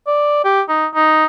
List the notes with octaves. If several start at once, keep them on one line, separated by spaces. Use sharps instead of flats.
D5
G4
D#4
D#4